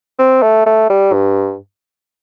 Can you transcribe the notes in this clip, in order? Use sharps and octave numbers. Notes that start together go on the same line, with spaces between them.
C4
A3
A3
G3
G2